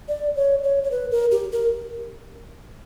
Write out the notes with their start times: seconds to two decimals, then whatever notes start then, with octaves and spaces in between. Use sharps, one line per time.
0.08 D5
0.36 C#5
0.63 C#5
0.83 C#5
0.91 B4
1.11 A#4
1.31 G4
1.52 A#4